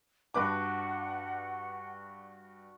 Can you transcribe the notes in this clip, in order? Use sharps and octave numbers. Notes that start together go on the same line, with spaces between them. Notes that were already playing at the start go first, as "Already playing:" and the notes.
G2 D4 F#4 B4 F#5 D6